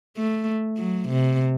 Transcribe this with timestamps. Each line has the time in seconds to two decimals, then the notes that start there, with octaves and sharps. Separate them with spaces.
0.17 A3
0.78 F#3
1.08 C3